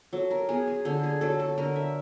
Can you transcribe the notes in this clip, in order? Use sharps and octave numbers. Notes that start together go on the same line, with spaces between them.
F#3 A4
A#4
B3 G#4
G#4
D3 A4
G#4
F#3 A4
A4
D3 A#4
E5